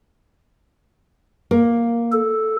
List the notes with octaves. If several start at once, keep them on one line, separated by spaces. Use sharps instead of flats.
A#3
A4